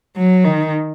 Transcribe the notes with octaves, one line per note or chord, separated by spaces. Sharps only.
F#3
D#3